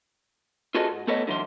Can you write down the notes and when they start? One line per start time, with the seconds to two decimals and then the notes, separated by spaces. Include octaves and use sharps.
0.75 F4 F#4 G#4 A4 B4 D#5
0.91 G#2
1.07 A3 B3 A4 B4 C#5 D#5
1.26 C#2 D3 E3 F#3 C6